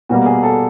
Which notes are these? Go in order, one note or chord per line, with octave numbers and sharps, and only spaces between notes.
B2 G3 A#3 F#4
G#4
A4